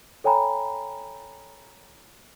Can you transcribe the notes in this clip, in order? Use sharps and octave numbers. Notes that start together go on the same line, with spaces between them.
A4 C#5 G5 G#5 A#5 B5